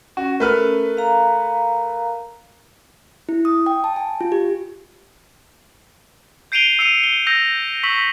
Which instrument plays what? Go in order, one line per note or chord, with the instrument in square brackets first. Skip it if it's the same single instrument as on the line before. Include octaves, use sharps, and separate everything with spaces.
[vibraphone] C#4 [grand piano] F#4
[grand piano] A3 B4 F6 [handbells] A#4
[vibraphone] F5 A#5
[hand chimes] E4
D#6
G5
A5
G#5
F4
G4
[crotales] G6 C7 D7 D#7 F7 G7
E6 C7 C#7 D#7 F7
G7
E6 G6 A#6 F7
C#6 E6 B6 F#7